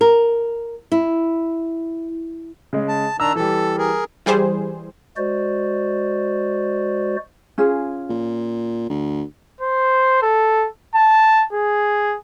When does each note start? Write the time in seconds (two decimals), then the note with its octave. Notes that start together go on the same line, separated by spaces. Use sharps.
0.01 A#4
0.92 E4
2.73 C#3 G#3
2.88 A5
3.20 D#3 D4 A#5 E6
3.36 E3 G3 A4
3.78 G#4 A#4
4.26 E3 G3 G#4 C5
5.17 G#3 F#4 C5 D5
7.58 C#4 F4 G#4
8.09 A#2
8.90 D2
9.61 C5
10.22 A4
10.95 A5
11.53 G#4